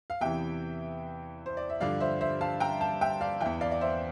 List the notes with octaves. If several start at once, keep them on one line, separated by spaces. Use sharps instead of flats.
F5
E2 C3 E3 E5 G5
C5
D5
E5
G2 D3 F3 D5 F5
C5 E5
C5 E5
F5 A5
G5 A#5
F5 A5
E5 G5
D5 F5
E2 E3 E5 G5
D5 F5
D5
C5 E5